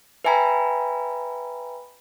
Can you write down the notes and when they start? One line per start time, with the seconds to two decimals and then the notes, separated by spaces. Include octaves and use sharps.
0.25 B4 E5 G5 G#5 A#5 B5